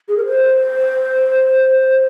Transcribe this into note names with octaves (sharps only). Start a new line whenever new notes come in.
G#4
A#4
C5